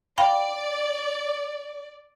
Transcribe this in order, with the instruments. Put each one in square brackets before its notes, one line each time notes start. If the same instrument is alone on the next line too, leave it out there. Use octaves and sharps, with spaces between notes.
[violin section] D5 [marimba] F5 G5 B5